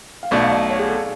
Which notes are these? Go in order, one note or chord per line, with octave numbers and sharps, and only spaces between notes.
F5
B1 B2 A3 D5
F5
D5
C#5
G#4
A4